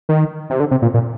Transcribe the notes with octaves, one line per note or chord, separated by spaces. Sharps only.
D#3
C3
D3
C3
A#2
A#2